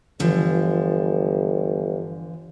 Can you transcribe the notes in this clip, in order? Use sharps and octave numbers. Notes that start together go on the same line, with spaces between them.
G1 D3 E3 F3